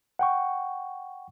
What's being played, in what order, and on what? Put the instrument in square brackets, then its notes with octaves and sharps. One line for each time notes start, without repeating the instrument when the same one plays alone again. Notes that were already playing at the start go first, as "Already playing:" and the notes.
[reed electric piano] F#5 G5 C#6